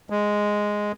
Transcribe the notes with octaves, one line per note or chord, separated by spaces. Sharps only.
G#3